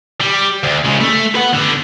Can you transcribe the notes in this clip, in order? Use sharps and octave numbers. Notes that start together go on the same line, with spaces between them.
G3
D2
C#3 G#3
A3
B4 F#5
D3 B3